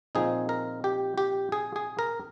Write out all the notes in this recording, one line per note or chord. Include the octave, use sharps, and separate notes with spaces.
A#2 F3 C4 D#4 G#4
A#4
G4
G4
G#4
G#4
A#4